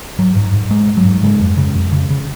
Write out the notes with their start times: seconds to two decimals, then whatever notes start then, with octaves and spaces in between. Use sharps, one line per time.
0.19 G#2 F#3
0.36 G#2
0.53 G#2
0.71 G#2 G#3
0.88 G#2
0.97 F#3
1.05 G#2
1.23 C#3 G#3
1.41 F2
1.57 C#3
1.75 F2
1.92 C#3
2.10 C#3